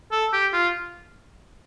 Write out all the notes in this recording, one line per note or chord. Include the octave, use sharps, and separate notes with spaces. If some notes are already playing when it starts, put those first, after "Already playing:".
A4
G4
F4